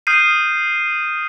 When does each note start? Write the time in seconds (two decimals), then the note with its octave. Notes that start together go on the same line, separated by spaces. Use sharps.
0.07 D#6 F6 G6 C7 D#7